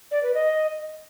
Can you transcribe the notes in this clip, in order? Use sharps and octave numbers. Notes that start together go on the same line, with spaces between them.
D5
B4
D#5